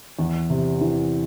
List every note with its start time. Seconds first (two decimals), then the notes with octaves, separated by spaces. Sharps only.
0.19 E2
0.50 C3
0.81 E3